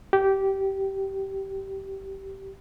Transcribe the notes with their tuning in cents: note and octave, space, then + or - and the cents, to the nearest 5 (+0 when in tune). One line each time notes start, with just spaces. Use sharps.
G4 -15